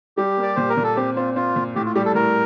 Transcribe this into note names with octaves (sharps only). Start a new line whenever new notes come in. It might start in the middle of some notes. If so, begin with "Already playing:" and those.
G3 G4
A#3
D5
A#2 C5
A#4
A#2
A4
C4 G4
C4 F4
C4 F4
A#2
A2 G4
F4
G3 G4
A4
A2 A#4